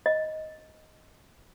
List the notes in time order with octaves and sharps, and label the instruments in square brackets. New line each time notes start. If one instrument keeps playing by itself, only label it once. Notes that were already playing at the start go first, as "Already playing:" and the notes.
[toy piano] D#5